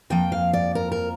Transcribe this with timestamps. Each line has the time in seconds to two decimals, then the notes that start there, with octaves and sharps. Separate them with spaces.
0.10 F2 F3 A#3 G5
0.32 F5
0.53 D5
0.75 A#4
0.92 A#4